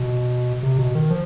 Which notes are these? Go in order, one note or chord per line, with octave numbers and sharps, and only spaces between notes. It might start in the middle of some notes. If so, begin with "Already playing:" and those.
Already playing: B2
C3
B2
D#3
F3